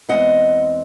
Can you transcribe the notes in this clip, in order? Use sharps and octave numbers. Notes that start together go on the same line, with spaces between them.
E2 D#3 G#3 C4 D#5 F#5